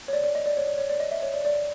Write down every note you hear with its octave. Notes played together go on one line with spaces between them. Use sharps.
C#5
D5
D5
D#5
D5
C#5
D5
C#5
D5
D#5
E5
C#5
D5
D5